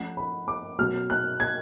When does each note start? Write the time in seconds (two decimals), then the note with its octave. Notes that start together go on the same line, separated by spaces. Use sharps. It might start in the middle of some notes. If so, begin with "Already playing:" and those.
Already playing: F3 A3 C#4 F#5
0.17 B5
0.48 D6
0.79 B2 F#3 A3 C#4 F6
1.10 F#6
1.40 G#6